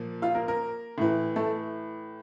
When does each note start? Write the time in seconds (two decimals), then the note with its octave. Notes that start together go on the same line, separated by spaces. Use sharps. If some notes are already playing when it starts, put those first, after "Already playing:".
Already playing: A#2 F3
0.22 F4 F5
0.35 A#3 A#4
0.48 A#3 A#4
0.98 A2 E3
1.36 A3 A4